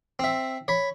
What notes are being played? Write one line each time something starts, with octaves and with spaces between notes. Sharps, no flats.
C4 E5
C#5 B5